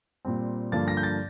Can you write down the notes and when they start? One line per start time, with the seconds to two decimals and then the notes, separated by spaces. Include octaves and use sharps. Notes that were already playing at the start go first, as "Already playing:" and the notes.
0.25 A#2 G3 C4
0.72 G2 D3 F3 A#3 D4 A6
0.88 A#6
0.97 G6
1.03 A6